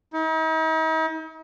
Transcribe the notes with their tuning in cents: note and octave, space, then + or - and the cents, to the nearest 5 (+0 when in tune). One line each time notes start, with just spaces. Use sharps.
D#4 +45